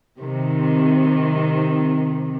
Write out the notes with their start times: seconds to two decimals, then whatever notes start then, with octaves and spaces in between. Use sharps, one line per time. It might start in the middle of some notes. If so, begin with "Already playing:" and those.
0.19 C3 D#3